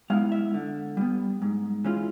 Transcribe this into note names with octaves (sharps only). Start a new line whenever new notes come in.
G#3 B3 E4 F5
E5
D3
G3 B3
G#2
E3 G#3 C#4 F4